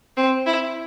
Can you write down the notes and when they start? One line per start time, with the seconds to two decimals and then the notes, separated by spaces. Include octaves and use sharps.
0.17 C4
0.46 E4